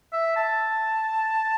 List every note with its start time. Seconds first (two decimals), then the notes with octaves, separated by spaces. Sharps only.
0.13 E5
0.36 A5